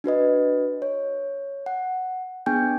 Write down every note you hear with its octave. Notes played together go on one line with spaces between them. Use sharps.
D4 F#4 B4 D#5
C#5
F#5
B3 D4 G#4 G5 G#5 G6